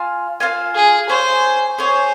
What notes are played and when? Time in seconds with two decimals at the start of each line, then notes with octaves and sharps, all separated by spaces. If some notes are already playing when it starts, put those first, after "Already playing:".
Already playing: F4 C5 F5 G#5
0.40 F4 C5 F5 G#5
0.75 G#4
1.09 G#4 C5 C#5 G#5
1.78 G#4 C5 C#5 G#5